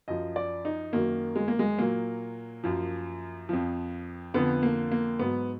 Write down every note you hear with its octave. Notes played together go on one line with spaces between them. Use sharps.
F#2 F3 D#5
D5
D#4
F#2 D#3 F#3 A#3
G#3
A#3
G#3
A#2 F#3 A#3
F#2 F3
F2 F3
F2 D3 F3 B3
A#3
A#3
G#2 F#3 B3